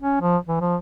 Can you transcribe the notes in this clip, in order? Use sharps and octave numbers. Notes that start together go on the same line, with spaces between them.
C#4
F3
E3
F3